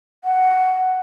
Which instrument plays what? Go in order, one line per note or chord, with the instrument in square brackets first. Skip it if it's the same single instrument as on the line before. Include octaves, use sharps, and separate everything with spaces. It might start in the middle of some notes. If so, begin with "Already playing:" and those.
[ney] F#5